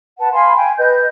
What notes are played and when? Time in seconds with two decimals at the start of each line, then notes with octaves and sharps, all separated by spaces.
0.19 B4 F#5 A5
0.33 F5 G#5 B5 C6
0.56 G5 G#5
0.77 B4 D#5 G6